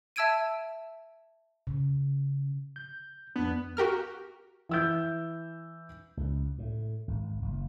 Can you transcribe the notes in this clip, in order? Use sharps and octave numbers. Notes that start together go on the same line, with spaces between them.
E5 A5 E6 G#6 D7 D#7
C#3
G6
F2 B3 D4
F#4 G4 A#4 F6
E3 E6 G6
C#2
A2
G#1
F#1